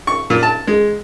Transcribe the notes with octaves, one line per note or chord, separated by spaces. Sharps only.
C#6
A#2
A5
G#3